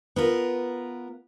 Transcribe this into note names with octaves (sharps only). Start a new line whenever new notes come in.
B3 F4 A#4